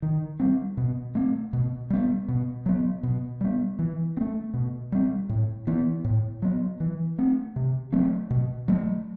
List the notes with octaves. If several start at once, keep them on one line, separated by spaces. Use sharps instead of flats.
D#3
G3 C4
B2
A3 C4
B2
G3 B3
B2
F#3 B3
B2
G3 B3
E3
C4
A3
B2
G3 C4
A2
E3 B3
A2
F#3 B3
E3
A3 C4
C3
F#3 A3 C4
B2
F#3 A3